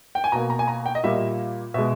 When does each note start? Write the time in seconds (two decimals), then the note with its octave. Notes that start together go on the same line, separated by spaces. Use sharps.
0.15 G5
0.24 G#5
0.32 B2 A#3 A#5
0.50 A#5
0.59 G#5
0.68 A#5
0.86 G5
0.95 D#5
1.03 A#2 G3 A#3 E5
1.74 B2 G#3 E5